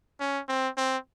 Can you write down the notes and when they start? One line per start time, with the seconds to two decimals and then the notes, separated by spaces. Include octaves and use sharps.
0.20 C#4
0.48 C4
0.77 C4